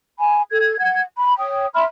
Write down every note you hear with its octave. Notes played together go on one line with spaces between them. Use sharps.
G#5 B5
A4 G#6
F#5 G#6
B5
C#5 G5 D#6
E5 B5 C6 F6